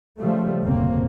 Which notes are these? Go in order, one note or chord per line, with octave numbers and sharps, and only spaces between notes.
C#3 F3 G3 A3
F1 D2 A#2 C#3 A#3 C4